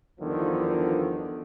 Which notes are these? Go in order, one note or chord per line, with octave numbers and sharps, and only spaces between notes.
G1 E2 D3 D#3 F3